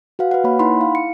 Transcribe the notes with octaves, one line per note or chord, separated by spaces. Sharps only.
F#4 B4 F5 F#5
B4 F#5
A#3 C#5 B5
D#4 E4 F#5 B5 C6
E4 F5
C#7